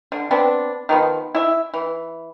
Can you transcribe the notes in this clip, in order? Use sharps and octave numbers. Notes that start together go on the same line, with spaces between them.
D3
B3 C4 D4
D#3 F3 B3
E4 E5
E3